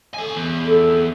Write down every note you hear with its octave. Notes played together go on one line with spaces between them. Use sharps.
A4 G#5
E2
A4